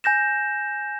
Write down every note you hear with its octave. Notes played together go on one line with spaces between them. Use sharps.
G#5 G6 A#6 E7